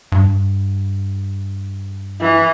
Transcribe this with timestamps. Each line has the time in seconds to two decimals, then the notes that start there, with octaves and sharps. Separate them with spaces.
0.12 G2
2.21 E3